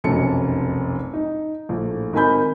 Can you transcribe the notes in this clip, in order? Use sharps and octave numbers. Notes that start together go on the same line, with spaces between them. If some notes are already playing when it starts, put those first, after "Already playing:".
F1 B1 F#2 C#5 A5 C#7
D#4
A#1 A2
G#1 D#4 A#4 G#5 B5 G6